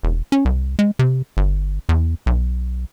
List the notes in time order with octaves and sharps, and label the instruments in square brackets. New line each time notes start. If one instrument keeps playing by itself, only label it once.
[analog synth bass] E1
C#4
C2
G#3
C3
G1
E2
B1